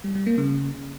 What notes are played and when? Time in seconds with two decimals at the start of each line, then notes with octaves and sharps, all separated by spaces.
0.04 G3
0.15 G3
0.27 A#3
0.38 C#3